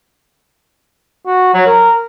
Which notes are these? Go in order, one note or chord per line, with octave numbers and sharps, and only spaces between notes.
F#4
F#3
A#4